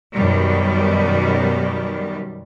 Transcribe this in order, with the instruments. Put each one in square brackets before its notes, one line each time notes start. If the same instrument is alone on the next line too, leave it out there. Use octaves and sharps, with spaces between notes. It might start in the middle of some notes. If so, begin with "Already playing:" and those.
[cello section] F#2 B2 D#3 G3